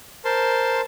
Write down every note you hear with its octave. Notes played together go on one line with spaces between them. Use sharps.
A#4 C5 A5 C6